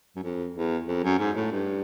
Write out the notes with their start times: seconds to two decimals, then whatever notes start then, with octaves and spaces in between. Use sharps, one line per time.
0.16 F#2
0.24 F2
0.55 E2
0.88 F2
1.04 F#2
1.19 G#2
1.36 A2
1.52 G2